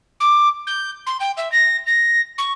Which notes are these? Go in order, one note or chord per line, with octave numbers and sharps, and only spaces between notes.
D6
G6
C6
G5
E5
A#6
A#6
C#6